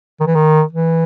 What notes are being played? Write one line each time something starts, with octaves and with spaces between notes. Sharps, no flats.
D#3
E3
D#3
E3